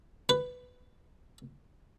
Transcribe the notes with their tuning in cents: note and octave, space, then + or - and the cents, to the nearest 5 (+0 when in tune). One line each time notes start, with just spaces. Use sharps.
B4 +10